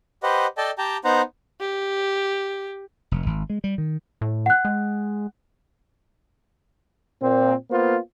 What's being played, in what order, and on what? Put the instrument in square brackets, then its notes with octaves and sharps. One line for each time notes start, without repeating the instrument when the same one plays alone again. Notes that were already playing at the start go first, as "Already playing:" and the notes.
[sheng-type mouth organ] G4 B4 C5 D#5 F#5
A4 D5 D#5 G5 A5
G4 G5 A5 A#5
B3 D#4 C5 F#5 A#5
[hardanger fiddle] G4
[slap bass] F1
G#1
G#3
G3
D#3
[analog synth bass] A2
[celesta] F#5 F#6
[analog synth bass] G#3
[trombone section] A#2 C4
A#3 B3 F4 C5